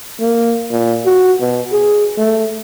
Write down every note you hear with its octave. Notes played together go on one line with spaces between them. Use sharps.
A#3
A#2
F#4
B2
G#4
A3